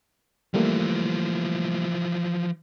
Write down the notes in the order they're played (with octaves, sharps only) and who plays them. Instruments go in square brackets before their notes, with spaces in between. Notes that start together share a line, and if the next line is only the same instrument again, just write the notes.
[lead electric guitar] E3 F3 [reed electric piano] G3 A3 A#3